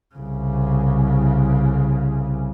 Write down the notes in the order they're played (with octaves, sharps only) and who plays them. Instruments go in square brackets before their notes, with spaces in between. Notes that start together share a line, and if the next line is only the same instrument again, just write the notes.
[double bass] C2 C#3